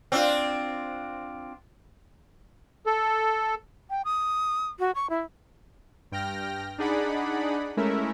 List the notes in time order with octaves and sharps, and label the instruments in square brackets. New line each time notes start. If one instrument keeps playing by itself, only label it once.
[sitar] C4 D4 F4
[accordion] A4
[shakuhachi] G5
D#6
F#4
C#6
E4
[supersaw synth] G2 G5 F6 A#6
D4 D#4 G#4 D5 F#5 B5
G#3 A3 C#4 E4 A#4 E5